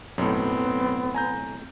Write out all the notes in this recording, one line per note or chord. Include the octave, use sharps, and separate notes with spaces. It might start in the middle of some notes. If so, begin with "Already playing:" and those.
B1 F#2 A2 B3 C4
G#5 A#5 G6